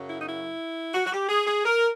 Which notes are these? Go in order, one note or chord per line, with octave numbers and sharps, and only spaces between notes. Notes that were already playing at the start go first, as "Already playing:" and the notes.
Already playing: F#2 C#3 F#3
E4
D#4
E4
F#4
F#4
G4
G#4
G#4
A#4